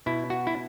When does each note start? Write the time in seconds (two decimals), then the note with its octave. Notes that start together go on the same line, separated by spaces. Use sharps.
0.06 B2 E4
0.30 F#4
0.47 E4